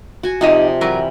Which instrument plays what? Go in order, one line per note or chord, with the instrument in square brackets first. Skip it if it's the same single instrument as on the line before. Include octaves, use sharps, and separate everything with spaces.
[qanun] F#4 G#5
[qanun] C3 F3 D5 [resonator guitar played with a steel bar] D#4 G4 D#5
[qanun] E3 G3 E4 [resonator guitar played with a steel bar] F#3 A#4